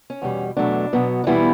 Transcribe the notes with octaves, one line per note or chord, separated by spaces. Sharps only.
C#4
E2 B2 G3
E2 B2 F#3 A3 D4
B2 F#3 B3
D4
E2 B2 E3 G3 B3 E4